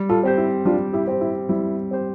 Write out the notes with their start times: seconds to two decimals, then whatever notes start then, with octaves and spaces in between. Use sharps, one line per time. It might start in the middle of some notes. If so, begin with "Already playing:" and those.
Already playing: G3
0.09 F4 A4
0.23 C4 G4 C5
0.37 E4
0.65 G3 D4 F4
0.93 E4 G4
1.07 C4 G4 C5
1.21 E4
1.49 G3 E4
1.91 C4 G4 C5